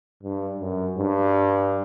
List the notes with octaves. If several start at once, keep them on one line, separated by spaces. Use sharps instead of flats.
G2
F#2
G2